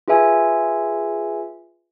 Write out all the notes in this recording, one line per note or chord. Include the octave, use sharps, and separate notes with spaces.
F4 G#4 B4 E5 G#5